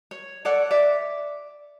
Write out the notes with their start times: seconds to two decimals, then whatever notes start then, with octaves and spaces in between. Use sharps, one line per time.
0.11 C#5
0.45 A4 C#5 D5 F#5
0.71 D5 E5